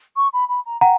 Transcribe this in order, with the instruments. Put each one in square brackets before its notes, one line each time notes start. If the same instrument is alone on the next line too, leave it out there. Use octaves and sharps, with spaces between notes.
[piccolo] C#6
B5
B5
A#5
[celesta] F#5 A#5 [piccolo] G5